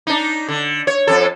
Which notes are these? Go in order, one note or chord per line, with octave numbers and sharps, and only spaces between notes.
D4 D#4
D3
C#5
F2 A4